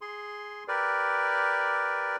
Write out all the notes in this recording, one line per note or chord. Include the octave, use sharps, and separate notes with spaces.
G#4 C6
G4 A#4 B4 D5